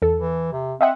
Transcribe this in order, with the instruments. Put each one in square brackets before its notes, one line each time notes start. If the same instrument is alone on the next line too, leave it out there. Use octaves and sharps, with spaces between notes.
[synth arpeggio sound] E2 A4
[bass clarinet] E3
C3
[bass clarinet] C4 [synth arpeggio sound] D#5 E5 F#5